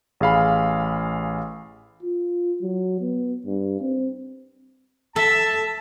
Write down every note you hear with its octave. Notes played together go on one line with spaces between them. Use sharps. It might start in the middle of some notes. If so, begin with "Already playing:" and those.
A1 G#4 F5 B5
F4
F#3
B3
G2
C4
A4 E5 A5